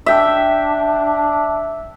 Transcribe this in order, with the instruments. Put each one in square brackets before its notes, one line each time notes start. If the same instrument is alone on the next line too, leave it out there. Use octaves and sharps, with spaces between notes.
[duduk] D4 [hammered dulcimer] E5 G5